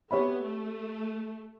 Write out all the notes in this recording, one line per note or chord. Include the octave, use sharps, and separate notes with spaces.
B3 G4 C#5 E5 B5
A3